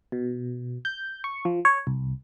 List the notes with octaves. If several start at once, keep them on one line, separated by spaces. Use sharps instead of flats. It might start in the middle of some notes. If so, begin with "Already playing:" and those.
B2
G6
C#6
F3
C#5
C2